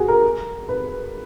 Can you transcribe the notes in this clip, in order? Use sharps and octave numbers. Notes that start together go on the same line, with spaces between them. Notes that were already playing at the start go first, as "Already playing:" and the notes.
Already playing: F#4 G#4
A#4
B4